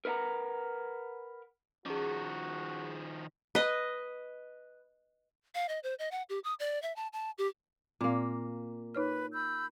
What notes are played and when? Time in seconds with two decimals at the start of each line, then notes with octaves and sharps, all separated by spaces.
0.05 A#4 B4 D#5 F#5 A#5
1.86 D#3 F3 C#4 F#4 G#4
3.55 B4 D#5
5.55 F5
5.69 D#5
5.83 C5
5.99 D#5
6.11 F#5
6.29 G4
6.44 D#6
6.60 D5
6.82 E5
6.96 A5
7.13 A5
7.38 G4
8.01 A#2 A#3 C4
8.95 D#4 B4 C#5 F6
9.32 B5 E6 G6